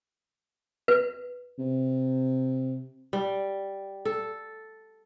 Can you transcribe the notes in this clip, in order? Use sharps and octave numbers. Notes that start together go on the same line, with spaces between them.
B4
C3
G3
A4